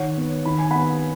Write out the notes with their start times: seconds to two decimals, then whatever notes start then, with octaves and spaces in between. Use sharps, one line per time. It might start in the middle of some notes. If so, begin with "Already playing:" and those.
Already playing: D#3 C#5 F#5
0.17 B3
0.45 D#3 B5
0.58 G#5
0.71 B3 F#5 B5